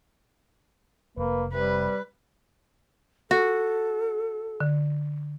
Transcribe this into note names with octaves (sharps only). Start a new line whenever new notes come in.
F1 A#3 B4
C3 G3 B4
F#4 A4
D3